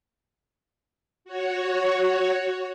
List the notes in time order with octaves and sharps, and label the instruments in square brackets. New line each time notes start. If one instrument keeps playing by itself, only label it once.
[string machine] F#4 C#5